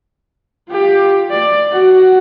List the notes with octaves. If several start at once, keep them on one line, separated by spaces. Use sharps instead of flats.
F4 G4
D5
F#4